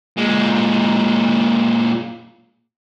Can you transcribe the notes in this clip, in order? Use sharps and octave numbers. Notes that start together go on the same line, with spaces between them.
A#2 G#3